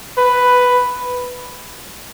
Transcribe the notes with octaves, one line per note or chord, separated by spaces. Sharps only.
B4